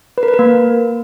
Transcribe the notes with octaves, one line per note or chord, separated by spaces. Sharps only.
B4
A#4
B4
A#4
A#3